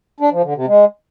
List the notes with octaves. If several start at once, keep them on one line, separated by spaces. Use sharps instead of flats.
D4
F3
D3
C3
G#3